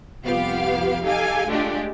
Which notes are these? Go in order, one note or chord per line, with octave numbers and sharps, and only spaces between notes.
C2 F2 B3 F4 G4 F5
D#4 G4 A4 F5 G#5
G#3 A3 D4 F4 G4